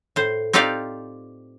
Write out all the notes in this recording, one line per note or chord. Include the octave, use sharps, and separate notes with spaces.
A2 C5
C4 D#4 F4 G4 D5 F5